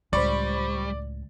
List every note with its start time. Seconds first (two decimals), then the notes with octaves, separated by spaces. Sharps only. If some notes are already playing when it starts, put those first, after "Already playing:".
0.13 C#2 A2 G3 C5 D5 B5 C#6